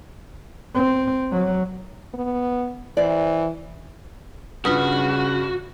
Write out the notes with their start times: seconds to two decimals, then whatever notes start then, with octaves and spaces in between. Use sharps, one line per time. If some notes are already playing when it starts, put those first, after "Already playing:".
0.75 C4
1.32 F#3
2.14 B3
2.97 E3 C5 D5
4.65 G2 C#3 F4 F#4 B4 D#6